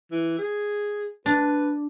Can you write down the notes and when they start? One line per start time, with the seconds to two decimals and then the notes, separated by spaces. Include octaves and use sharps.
0.11 E3
0.39 G#4
1.26 D4 B4